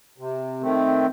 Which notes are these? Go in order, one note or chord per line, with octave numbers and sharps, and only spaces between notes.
C3
D#3 A3 C4